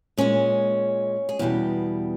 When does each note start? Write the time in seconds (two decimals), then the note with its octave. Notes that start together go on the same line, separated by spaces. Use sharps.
0.18 A#2 G#3 C#4
1.29 G#4
1.39 E2 B2 G3 G4